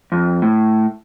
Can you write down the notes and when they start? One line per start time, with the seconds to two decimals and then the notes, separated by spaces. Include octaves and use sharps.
0.12 F2
0.42 A2